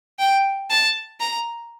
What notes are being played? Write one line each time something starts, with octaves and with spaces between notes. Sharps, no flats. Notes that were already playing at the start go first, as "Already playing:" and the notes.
G5
A5
A#5